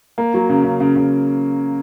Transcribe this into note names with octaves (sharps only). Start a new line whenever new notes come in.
A#3
F#3
C#3
C#3
C#3
C#3